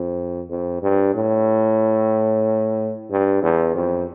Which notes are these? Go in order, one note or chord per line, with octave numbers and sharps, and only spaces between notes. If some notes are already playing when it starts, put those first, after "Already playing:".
Already playing: F2
F2
G2
A2
G2
E2
F2